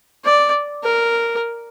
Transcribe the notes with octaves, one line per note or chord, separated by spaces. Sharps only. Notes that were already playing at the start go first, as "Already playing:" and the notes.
D5
A#4